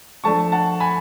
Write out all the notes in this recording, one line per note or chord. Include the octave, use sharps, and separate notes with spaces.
F3 A3 D4 A5 C#6
F#5 A5
G#5 B5